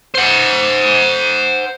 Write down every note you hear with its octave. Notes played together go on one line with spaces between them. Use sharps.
C5 F#5